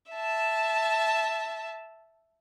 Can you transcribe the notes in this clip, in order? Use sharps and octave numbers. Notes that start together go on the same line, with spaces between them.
E5 A5